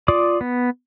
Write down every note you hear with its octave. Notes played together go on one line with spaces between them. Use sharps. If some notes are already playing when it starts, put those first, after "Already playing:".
F4 D5 D6 D#6
B3